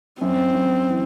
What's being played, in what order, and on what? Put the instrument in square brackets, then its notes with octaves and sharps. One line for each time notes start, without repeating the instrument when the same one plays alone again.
[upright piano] F#2 [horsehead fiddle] C4
[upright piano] F#2
E3